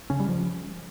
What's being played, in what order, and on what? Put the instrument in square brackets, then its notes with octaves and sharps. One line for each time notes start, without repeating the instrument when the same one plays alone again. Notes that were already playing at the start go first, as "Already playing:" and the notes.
[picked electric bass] C#3 C#4
G3
F3